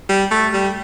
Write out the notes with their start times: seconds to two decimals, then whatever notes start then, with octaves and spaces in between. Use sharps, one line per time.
0.09 G3
0.31 A3
0.53 G3